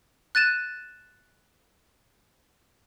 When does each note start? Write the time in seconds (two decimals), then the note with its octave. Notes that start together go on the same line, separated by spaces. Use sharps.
0.35 F#6 A6 D#7 E7